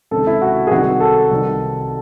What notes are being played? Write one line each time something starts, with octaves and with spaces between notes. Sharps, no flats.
C#2 C3 D#3 A4
E4
F#4
G#4
C2 C3 D#3 F#4
A4
C2 C3 D#3